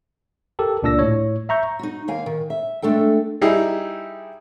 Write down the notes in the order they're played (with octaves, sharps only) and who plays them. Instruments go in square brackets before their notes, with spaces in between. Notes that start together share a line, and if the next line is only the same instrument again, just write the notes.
[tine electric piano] G4 A4 A#4
C#2 A#2 D4 D5 E6 A#6
A2 C#5
E5 A#5 C#6 G6
[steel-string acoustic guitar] D#4 F#4
D#2 D#3 A#3 F5 G#5
D#3
E5
G#3 A3 D4 A4 G5
[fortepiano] G3 D#4 E4 G4 G#4